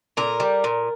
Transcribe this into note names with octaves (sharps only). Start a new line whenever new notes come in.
A#2 A#4
G3
A#2